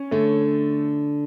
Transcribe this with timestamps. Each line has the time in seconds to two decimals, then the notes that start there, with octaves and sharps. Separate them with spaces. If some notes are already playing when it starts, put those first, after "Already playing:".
Already playing: C#4
0.11 D3 A3